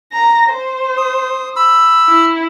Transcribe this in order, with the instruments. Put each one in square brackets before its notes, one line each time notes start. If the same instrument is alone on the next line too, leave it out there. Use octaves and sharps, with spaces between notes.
[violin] A#5 A#6
C5
[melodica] D#6
B5 E6
[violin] E4